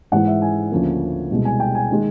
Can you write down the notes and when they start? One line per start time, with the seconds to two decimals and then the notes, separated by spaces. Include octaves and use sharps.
0.12 G#2 E3 G#3 F#5
0.27 E5
0.42 G#5
0.71 D2 C#3 F3 A#3
1.30 C2 B2 G#3
1.45 G#5
1.60 G5
1.75 G#5
1.91 D#3 G#3